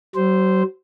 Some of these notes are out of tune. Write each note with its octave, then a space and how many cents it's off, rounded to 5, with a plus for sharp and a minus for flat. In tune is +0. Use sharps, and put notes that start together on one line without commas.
F#3 +40 C5 -10